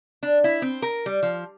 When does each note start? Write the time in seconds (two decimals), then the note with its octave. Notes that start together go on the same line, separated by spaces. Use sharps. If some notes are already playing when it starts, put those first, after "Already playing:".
0.23 D4
0.44 E4
0.62 C4
0.82 A#4
1.06 G3
1.23 F3